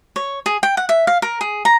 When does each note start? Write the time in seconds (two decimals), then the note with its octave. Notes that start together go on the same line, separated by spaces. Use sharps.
0.16 C#5
0.46 G#4
0.63 G5
0.77 F#5
0.89 E5
1.07 F5
1.22 A#4
1.41 G#4
1.65 A#5